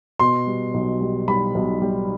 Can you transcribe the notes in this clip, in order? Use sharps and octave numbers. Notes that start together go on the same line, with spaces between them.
B2 C6
G3
B1
G3
G3 B5
B1
G3